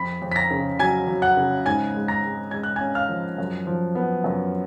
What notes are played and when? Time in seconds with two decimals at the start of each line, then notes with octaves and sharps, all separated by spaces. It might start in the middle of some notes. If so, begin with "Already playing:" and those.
Already playing: F2 B5 B6
0.22 F2
0.32 B6
0.36 A#5 A#6
0.51 C#3
0.79 F#3 G#5 G#6
1.07 F#3
1.22 F#5 F#6
1.37 C#3
1.66 G#2 G#5 G#6
1.94 G#3
2.08 A#5 A#6
2.23 G#3
2.51 G#3 G#6
2.63 F#6
2.76 C#4 G#5 G#6
2.95 F5 F6
3.09 F3
3.38 F#2
3.67 F3
3.95 B3
4.24 F#2